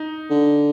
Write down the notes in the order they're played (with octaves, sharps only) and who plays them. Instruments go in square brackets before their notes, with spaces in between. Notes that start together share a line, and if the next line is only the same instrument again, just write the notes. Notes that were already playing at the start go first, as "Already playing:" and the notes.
Already playing: [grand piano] D#4
[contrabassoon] D3